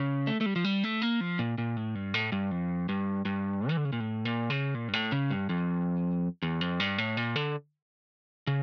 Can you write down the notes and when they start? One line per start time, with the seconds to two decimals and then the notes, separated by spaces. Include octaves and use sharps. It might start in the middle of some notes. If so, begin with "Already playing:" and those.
Already playing: C#3
0.27 A3
0.41 A3
0.46 G3
0.56 F3
0.65 G3
0.84 A3
1.02 A#3
1.21 F3
1.39 A#2
1.58 A#2
1.77 A2
1.95 G2
2.14 A2
2.32 G2
2.51 F2
2.89 G2
3.25 G2
3.69 E3
3.77 D3
3.85 C#3
3.92 A#2
4.00 A2
4.25 A#2
4.50 C#3
4.75 A#2
4.88 G2
4.93 A2
5.12 C#3
5.31 G2
5.49 F2
6.43 E2
6.61 F2
6.80 G2
6.98 A2
7.17 A#2
7.36 D3
8.47 C#3